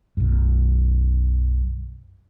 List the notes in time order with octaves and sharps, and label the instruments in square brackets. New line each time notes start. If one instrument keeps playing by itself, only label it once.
[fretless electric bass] B1 F#2